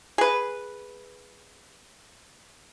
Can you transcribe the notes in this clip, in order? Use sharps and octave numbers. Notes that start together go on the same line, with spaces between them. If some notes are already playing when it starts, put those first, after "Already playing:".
G#4 B4